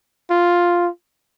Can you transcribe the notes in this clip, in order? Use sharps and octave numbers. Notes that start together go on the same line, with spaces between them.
F4